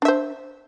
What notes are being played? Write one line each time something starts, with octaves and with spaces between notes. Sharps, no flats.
D4 C5 E5